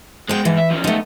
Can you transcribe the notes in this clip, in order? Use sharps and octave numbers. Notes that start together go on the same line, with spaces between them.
G#3 B3 C5 G5
G#2 E3
E5
F3 C#4
D#2 A3 B3 D#4